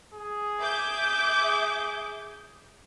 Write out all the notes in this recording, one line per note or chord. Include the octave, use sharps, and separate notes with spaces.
G#4
E5 D6 G6